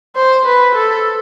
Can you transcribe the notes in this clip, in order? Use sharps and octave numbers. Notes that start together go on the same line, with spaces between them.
C5
B4
A4